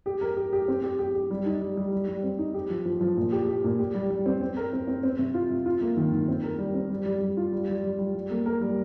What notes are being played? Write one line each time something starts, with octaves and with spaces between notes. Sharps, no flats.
G4
A#4
G4
G4
C4
G4
G4
G4
G3
D#4
G3
G3
G3
G3
C4
D#4
G4
F3
F3
F3
A#2
G4
G4
A#2
G4
G3
G3
C4
C4
A#4
C4
C4
C4
C3
F4
C3
F4
A#3
D#3
D#3
C4
A#4
G3
C4
G3
G3
G3
F4
G3
G3
G3
G3
G3
A#3
A#4
G3